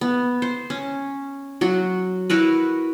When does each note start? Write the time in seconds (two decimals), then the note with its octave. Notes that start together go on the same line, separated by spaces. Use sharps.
0.01 B3
0.42 C5
0.70 C#4
1.61 F#3 F#4
2.30 E4 F#4 A#4 B4